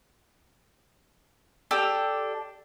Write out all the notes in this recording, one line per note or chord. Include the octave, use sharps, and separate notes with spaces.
D4 G4 A4 E6